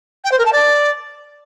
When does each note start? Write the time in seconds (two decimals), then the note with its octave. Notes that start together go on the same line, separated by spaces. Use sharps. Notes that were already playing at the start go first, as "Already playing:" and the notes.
0.24 G5
0.31 C5
0.38 A#4
0.45 A5
0.52 D5